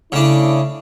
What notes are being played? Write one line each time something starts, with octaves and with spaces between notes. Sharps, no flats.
C#3 A3 D4 E4